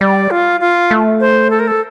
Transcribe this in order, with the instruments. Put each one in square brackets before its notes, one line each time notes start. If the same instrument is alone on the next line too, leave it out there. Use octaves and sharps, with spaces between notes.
[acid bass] G3 [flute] D5
[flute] F4
F4
[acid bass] A3
[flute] C5
A4
A#4
A4